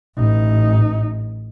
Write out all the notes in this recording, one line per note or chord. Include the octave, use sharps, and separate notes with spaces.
A1 D#4